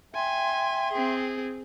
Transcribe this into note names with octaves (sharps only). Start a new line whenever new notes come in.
E5 G5 G#5 C6
C4 G#4